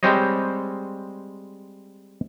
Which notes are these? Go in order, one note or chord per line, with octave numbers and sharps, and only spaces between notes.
G3 G#3 C4 C5 C#5 D#5